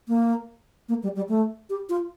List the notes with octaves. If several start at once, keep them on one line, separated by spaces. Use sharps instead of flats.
A#3
A#3
G3
G3
A3
G4
F4